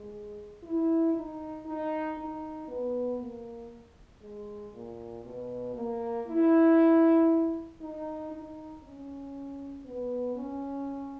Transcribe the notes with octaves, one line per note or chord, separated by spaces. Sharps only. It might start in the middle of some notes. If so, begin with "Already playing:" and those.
Already playing: G#3
E4
D#4
D#4
D#4
B3
A#3
G#3
A#2
B2
A#3
E4
D#4
D#4
C#4
B3
C#4